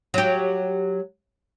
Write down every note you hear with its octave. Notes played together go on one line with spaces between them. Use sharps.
F#3 G4